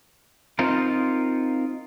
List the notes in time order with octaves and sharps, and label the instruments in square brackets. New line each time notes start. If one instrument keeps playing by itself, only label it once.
[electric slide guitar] C4 D#4 F4 A#4